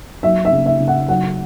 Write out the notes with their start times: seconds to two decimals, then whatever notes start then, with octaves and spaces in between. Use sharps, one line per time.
0.23 F#3 E5
0.45 E5
0.52 C#3
0.66 E5
0.80 C#3
0.88 F#5
1.08 F#3 F#5